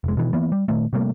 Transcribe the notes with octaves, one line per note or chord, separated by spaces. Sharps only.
F1 G#3
B2 D#3 E3
E3 A#3 B3
G3
A#2 D#3 A3
C3 G3 A3 A#3